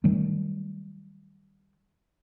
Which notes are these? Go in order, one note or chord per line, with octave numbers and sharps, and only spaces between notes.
D#3 F#3 G3 A3